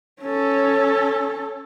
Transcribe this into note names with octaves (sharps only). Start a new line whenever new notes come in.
C#4 A4